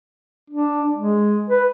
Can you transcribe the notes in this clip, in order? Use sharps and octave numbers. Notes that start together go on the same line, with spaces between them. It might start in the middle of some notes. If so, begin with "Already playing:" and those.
D4
G#3
B4